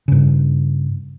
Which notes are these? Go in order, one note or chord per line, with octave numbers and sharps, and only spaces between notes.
G2 C#3